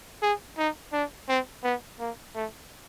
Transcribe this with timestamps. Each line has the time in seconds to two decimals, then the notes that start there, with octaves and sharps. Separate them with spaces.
0.22 G#4
0.58 D#4
0.93 D4
1.29 C4
1.64 B3
2.00 A#3
2.35 A3